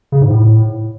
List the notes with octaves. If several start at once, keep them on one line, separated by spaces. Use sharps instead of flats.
C#3
G#2
A2